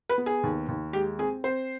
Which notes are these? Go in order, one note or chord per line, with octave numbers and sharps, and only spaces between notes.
B4
B3
G#4
D#2
D#2
G#3 G4
C4 G#4
C4 C5